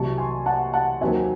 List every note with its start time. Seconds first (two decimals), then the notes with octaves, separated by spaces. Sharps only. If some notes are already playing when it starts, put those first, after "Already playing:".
Already playing: C2 C3 F#3 A5 C#6
0.18 G#5 C6
0.46 F#5 A5
0.74 F#5 A5
1.01 D#2 D#3 F#3 C4 E5 G#5